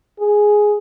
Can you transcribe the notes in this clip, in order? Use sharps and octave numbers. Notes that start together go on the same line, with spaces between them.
G#4